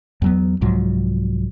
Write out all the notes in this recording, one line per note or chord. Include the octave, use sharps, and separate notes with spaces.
E2 F#3 B3
C2 G#2 F3 F#3